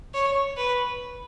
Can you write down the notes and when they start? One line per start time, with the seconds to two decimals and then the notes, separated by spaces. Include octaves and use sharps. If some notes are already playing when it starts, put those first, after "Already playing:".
0.14 C#5
0.57 B4